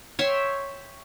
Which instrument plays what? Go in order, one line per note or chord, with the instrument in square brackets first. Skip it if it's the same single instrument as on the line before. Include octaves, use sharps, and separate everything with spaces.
[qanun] C#5 E5 G5 C6